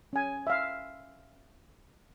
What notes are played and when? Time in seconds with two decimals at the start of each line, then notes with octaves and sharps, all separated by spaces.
0.13 C#4 G#5
0.47 E5 F5